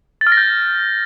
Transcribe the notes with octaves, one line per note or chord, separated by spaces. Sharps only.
A6
F6
A#6
G6